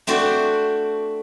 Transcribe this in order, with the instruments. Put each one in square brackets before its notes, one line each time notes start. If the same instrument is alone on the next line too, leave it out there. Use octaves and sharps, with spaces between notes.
[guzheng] A3 C4 D4 F#4 C5 D5